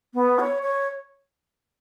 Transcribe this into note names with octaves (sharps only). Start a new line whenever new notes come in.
B3
C#5
C#5